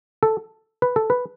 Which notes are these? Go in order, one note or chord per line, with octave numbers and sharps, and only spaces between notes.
A4
B4
A4
B4